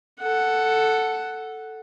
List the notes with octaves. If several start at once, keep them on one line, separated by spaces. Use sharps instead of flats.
A4 F#5